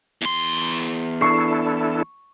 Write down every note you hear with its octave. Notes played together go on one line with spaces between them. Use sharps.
E2 C6
D4 E4 A4 C#6 C7